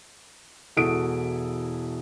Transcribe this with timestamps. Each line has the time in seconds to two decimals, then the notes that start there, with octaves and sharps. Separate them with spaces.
0.77 E1 E4 F#4 A4 D#6 D7